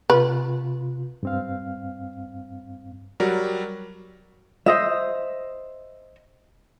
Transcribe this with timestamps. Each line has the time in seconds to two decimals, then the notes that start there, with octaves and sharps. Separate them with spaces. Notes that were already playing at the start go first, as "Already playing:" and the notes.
0.10 C3 F4 B4
1.23 G2 C4 F5
3.20 F#3 G3 F#4 A#4 D5
4.66 C5 D#5 E5